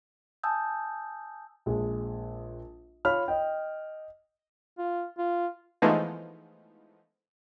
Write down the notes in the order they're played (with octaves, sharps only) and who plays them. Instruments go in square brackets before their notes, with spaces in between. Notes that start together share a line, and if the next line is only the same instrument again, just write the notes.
[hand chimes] G#5 A5 D#6 E6 G6
[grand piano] A#1 G#3
F4 C#5 B5 F6
D#5 G5
[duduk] F4
F4
[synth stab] E3 F3 G#3 A3 B3 D#4